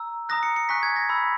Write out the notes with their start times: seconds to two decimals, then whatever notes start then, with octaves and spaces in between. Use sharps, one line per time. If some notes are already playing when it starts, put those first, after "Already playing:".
Already playing: A#5 E6
0.29 A#5 D#6 F#6 A#6
0.43 C#7
0.56 C#7
0.69 G#5 C#6 F#6 B6
0.83 G#6
0.96 A#6
1.09 B5 E6 B6